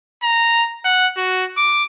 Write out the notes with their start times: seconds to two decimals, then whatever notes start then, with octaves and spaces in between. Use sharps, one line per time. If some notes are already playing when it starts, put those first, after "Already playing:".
0.23 A#5
0.85 F#5
1.17 F#4
1.57 D6